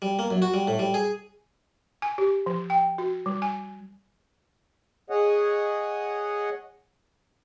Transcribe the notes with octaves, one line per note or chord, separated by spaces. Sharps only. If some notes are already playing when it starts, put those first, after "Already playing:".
G3
A#3
F#2
F#4
G3
A2
G3
G#4
G#5
G4
F3
G5
F#4
G3
G#5
G#4 C#5 D#5 F#5